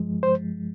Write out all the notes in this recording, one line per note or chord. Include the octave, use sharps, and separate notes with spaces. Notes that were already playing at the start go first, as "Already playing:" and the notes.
Already playing: G2 F3 G#3
C5